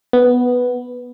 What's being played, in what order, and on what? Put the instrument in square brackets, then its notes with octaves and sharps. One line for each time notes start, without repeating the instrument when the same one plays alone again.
[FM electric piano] B3